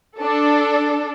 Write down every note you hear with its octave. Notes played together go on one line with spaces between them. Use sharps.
D4 A4